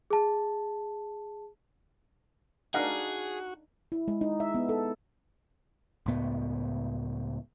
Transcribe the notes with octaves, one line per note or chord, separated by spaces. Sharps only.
G#4 A5
D4 D#4 F#4 G#4 A#4 D#5 F5 F#5
E4
G#3
D#4
E5
B3
A4
C#2 A2 B3